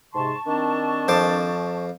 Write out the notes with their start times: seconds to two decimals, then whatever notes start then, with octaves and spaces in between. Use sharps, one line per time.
0.14 G#2 C3 A5 C6 C#6
0.46 D#3 C4 D4
1.08 F2 C5 D6